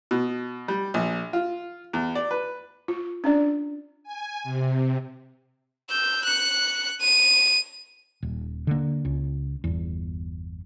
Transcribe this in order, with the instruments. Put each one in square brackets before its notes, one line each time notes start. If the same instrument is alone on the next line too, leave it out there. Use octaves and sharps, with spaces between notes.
[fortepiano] B2
G3
A#1
F4
E2
D5
B4
[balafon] F4
C#4 D4 D5
[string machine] G#5
C3
[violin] E6 G6
F#6 C#7
D#7
[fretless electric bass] D#1
D3 A#3
C#2
G1 E2